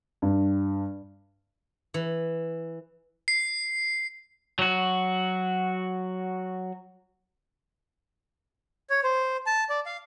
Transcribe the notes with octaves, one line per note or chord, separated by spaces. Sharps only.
G2
E3
C7
F#3 F#4
C#5
C5
A5
D5
F5